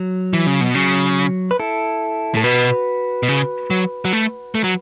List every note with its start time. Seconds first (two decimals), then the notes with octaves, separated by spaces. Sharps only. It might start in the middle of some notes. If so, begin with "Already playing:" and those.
Already playing: F#3
0.33 E3
0.47 C#3
0.61 B2
0.75 C#3 F#3
1.51 B4
1.59 E4 A4
2.34 A2 A4
2.44 B2 F#4 B4
3.23 B2
3.28 C#3
3.70 F#3
4.05 F#3
4.13 A3
4.55 A3
4.64 F#3